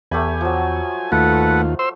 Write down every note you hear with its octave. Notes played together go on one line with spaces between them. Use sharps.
E2 A3 G4 G#5 B5
F3 F#3
D#2 A3 F4 A4 B4 F#5
C5 C6 E6